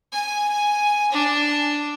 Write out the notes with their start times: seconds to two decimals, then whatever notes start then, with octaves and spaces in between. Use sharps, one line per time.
0.12 G#5
1.12 D4